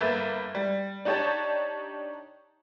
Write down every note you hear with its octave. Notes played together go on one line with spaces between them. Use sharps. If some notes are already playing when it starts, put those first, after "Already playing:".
G1 A#3 B4 E5 A6 E7
G3
D4 D#4 G4 C#5 D5 A5